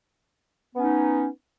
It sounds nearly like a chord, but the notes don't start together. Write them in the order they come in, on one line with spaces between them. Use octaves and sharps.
B3 C#4 D#4